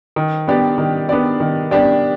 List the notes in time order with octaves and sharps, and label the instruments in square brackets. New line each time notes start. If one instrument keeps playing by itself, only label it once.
[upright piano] D#3
B3 D4 G4 D5
D#3
B3 D4 G4 D5
D#3
B3 D4 G4 D5